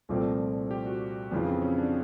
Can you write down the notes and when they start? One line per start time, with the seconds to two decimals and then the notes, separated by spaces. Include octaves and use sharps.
0.09 C2 A#2 F3 A3 C4
0.71 G4
0.86 F#4
1.31 F2 C#3 E3 B3
1.47 C4
1.62 C#4
1.78 D4